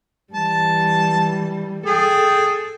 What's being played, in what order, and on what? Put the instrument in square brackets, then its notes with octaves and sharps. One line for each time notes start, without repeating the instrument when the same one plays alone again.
[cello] E3 G3 [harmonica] A5
[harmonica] G#4 G5 [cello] A4